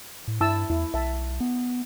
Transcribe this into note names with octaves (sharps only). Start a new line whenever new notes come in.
A2
G2 E4 A5 E6
E2 E4
B1 E5 A5
B3